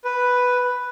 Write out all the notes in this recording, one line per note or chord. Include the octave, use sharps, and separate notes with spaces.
B4